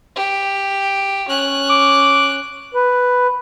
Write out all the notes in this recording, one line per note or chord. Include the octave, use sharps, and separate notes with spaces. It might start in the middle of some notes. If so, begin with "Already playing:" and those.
G4
C#4 F#6
D6
B4